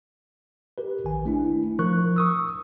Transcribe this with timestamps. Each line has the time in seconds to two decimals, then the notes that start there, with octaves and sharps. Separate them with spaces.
0.78 G4 A#4 B4
1.04 A#1 D#3 G#5
1.25 A3 D4 E4
1.79 F3 A#4 C#6 F#6
2.16 C#6 D#6 E6